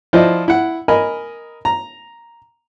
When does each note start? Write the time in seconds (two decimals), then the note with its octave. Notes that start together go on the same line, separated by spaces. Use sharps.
0.13 F3 E4 C5 D5 D#5
0.48 E4 F#5
0.88 A#4 D#5 G#5 B5
1.65 A#5